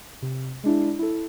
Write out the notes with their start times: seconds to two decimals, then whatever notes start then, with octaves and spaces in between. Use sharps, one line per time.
0.22 C3
0.64 G#3 D4 E4
0.99 E4 A4